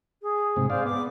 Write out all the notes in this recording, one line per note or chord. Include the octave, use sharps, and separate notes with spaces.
G#4
G#2 C3
G#4 C5 D5 F5
B3 D6